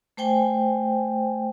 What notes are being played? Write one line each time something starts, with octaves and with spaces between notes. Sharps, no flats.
A3 C5 G5 G#5